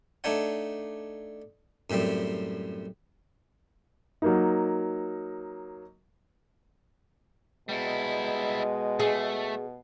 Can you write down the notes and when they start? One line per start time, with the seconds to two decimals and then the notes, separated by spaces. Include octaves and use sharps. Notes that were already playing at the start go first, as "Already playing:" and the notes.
0.24 A3 D4 D#4 C#5 F#5
1.90 F#2 A2 G3 C4
4.22 F#3 A#3 D#4
7.69 B2 G3 G#3 E4
9.00 A3 G#4